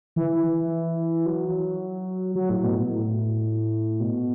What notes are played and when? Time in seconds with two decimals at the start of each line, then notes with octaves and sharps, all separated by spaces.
0.16 E3
1.26 F#3
2.35 F#3
2.49 A2
2.64 B2
2.77 A2
4.00 B2